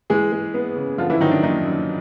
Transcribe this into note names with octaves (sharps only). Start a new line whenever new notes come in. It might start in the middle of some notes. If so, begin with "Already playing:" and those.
E3 G#3 G#4
G#3
B3
C#3
D3 F3 F4
E3 E4
D#3 F#3 D#4
D4
F#2 D#3 D#4
F#2